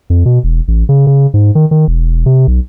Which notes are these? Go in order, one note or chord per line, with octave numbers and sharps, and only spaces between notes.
F2
B2
E1
A1
C#3
C#3
G#2
D#3
D#3
E1
C3
B1